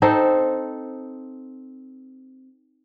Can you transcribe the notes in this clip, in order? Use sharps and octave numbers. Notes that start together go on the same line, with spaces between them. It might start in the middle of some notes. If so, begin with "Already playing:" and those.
C4 D#4 A4 C5